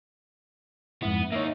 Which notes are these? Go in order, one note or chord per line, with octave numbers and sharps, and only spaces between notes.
F2 G#2 B3 E4
A#3 D#4 C#5 E5